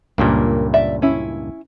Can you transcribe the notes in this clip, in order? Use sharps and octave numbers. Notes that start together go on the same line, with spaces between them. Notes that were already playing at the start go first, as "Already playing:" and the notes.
C#2 G2 A#2 A#3
D5 E5
C#4 E4